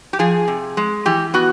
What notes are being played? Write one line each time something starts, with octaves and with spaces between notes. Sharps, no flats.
G4
F3 G#4
C3
G#3
E3 G4
B3 F#4